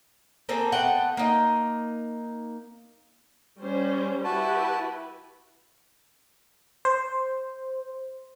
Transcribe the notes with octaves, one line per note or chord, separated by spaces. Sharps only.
A#3 C4 G#4 A4
A3 B3 F#5 G5
A#3 D#4
G3 C#4 C5
E4 F#4 G4 B4 A5
C5